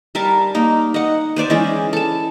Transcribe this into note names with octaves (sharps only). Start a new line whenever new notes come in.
G3 A#4 E5 A5
A#3 D#4
D#5 F#5
B4 C5 D5 E5
E3 G#3 C#4 E4
A4 A5